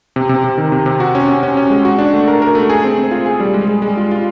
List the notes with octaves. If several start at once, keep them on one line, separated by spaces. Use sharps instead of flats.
C3
C3
C3
D#3
C3
C3
F#4
C#4
C#4
C#4
C#4
G#3
F#4
D4
A3
A#4
A#4
A3
G#4
C4
C4
F4
G#4
G3
G#3
G#3
G#3
F4
F4